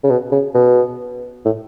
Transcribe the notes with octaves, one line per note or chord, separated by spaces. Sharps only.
C#3
B2
C#3
B2
A2